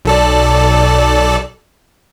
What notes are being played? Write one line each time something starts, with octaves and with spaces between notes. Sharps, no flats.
B1 A4 D5